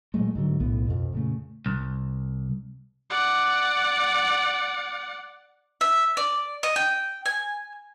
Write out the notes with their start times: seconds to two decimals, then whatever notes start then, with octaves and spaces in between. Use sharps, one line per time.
0.14 A#2 F#3 G#3 A3
0.35 G#2 D3 F#3
0.60 B1 A2 B3
0.87 F2 B2
1.13 A#2 C#3 A3
1.66 C2
3.10 D5 F#5
5.81 E5
6.17 D5
6.63 D#5
6.76 G5
7.26 G#5